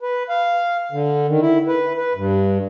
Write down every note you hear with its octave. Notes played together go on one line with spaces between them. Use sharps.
B4
F5
D3
D#3
E4
B4
B4
G2